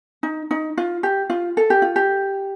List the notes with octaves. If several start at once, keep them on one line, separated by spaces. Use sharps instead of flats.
D#4
D#4
F4
G4
F4
A4
G4
F4
G4